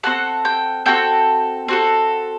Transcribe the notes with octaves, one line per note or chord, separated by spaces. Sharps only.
C4 F#4 A4 F#5
G5
C4 F#4 A4 G5
C4 F#4 A4